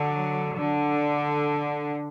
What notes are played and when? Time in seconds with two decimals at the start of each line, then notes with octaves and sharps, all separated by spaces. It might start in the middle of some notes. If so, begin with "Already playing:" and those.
Already playing: D3 F#3
0.57 D3